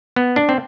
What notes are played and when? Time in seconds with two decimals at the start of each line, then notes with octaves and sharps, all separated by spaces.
0.16 B3
0.36 D4
0.49 C4